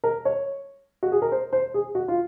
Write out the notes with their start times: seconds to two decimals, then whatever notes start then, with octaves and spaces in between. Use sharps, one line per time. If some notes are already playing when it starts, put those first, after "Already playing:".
0.04 A#4
0.25 C#5
1.03 F#4
1.12 G#4
1.22 A#4
1.32 C5
1.53 C5
1.74 G#4
1.95 F#4
2.08 F4